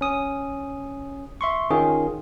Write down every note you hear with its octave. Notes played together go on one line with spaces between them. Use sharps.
C#4 D#6
E5 C6 C#6
D#3 C#4 F4 G#4